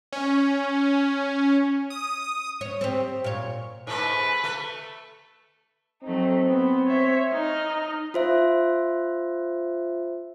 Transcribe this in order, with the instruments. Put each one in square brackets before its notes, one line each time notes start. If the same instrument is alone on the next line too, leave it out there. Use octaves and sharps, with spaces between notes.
[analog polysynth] C#4
D#6
[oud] C#5
C4 G4
A#2 C#5
[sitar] G#2 A3 [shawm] B4
[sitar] A3
[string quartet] F#3 A3 D#4 [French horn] C4
[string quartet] B3 C5
C5 C#5 E5
D#4 D#5 F6
[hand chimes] F4 C5 E5